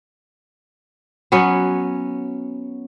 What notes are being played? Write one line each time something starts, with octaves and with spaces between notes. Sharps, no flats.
F#3 B3 C#4